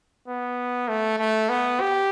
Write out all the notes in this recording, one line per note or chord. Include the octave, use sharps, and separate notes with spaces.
B3
A3
A3
B3
G4